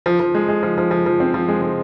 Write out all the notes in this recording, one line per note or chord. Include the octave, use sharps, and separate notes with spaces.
F3
F3
G#3
G#3
F3
F3
F3
F3
C4
F3
G#3
G#3